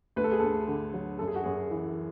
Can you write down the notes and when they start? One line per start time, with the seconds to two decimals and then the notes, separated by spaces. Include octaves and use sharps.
0.16 D2 B4
0.24 A4
0.32 G#4
0.40 D2 A4
0.67 D3
0.94 F#3
1.19 F#2 A4
1.28 G#4
1.36 F#4
1.44 F#2 G#4
1.71 E3